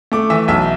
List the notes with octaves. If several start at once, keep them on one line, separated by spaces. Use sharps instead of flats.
A3 D6
E3 E5
B1 E5